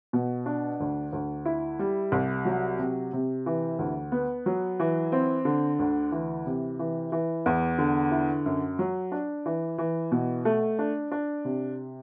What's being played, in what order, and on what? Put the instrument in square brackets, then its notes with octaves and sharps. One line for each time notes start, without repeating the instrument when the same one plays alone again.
[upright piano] B2
D4
D2
D2
E4
G3
C2
F#3
C3
C3
E3
D2
B3
F#3
E3
C4
D3
D2
E3
C3
E3
E3
E2
D3
E4
F#2
F#3
D4
E3
E3
B2
A3
D4
D4
C3